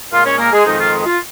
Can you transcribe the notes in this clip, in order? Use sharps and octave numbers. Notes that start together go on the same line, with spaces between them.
A#2 G#3 F4 F5
C#4 C#5
A#3 A#4
G#3 G#4
F2 D#3 G#3 D#4
F4
F4